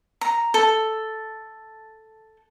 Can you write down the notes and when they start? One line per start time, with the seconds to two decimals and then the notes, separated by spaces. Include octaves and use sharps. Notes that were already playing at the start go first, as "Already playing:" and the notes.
0.21 A#5
0.54 A4